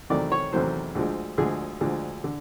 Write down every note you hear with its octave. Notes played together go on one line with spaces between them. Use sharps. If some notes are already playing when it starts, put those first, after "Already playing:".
E2 C3 D#3 F#3 A3 D5
C#5
E2 C3 D#3 F#3 A3 C5
D2 D3 F3 G#3
D2 D3 F3 G#3 G#4
D2 D3 F3 G#3
D3